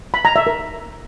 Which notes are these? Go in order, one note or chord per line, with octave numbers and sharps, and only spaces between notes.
B5
A#5
E5
A#4